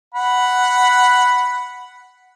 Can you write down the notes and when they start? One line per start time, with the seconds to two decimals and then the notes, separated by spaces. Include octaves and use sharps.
0.15 F#5 B5